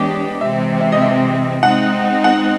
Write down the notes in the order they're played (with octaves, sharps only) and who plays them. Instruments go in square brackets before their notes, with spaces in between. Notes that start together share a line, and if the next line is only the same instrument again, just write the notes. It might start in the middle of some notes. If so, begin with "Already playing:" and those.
Already playing: [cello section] E3 G#3 B3 D4 G4 [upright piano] C#5 D#5
[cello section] C3 E3 G#3 C4 [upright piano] E5
[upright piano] E5
D#5
E5
[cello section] G#3 C4 D#4 [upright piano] F#5
[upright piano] F#5